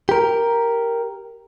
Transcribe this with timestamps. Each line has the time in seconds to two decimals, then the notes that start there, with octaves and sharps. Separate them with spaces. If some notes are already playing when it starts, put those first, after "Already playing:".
0.09 G4 A#4